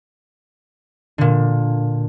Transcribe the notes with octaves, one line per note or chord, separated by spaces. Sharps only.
A#2 D3